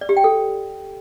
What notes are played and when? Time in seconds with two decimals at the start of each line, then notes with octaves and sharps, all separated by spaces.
0.01 D5
0.09 G4
0.17 G5
0.24 A4